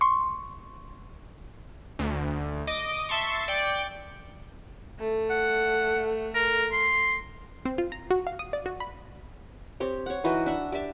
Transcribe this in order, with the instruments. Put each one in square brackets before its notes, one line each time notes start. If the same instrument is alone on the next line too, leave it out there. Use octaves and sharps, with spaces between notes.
[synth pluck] C6 C#6
[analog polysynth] D2
D#5 D6
E5 A5 C6 C#6
D5 G5 C#7
[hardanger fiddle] A3
[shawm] F#5
A#4
C6
[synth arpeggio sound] C4
F4
A#5
F#4
F5
D#6
D5
F#4
B5
[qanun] C4 G4 C#5
C#5 F#5
E3 D#4 F#4 B4
D4 E5 F#5
G4 D5 E5 A5